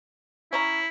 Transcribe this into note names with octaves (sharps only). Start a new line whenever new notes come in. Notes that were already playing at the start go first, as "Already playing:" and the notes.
C#4 E4 C#5 A#5